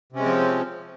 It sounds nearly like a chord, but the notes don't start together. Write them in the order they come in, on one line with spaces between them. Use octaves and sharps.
C3 C#4 G#3 C4 F3